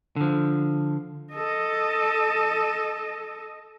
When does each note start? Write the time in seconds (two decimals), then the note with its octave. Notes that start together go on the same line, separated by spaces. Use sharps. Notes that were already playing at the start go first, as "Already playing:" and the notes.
0.16 D3 F3
1.33 A4 D#5